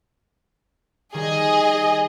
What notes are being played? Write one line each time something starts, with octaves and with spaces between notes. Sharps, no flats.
D#3 G3 G#4 D#5